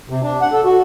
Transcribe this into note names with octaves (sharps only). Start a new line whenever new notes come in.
C3
D4
F#5
A4
F#4